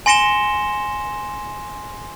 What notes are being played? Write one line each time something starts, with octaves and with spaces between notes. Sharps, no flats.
G#5 C6 A#6 C#7 E7 G7